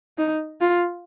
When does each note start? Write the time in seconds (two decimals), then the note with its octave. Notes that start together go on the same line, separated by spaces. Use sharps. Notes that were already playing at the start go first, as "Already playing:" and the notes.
0.18 D#4
0.61 F4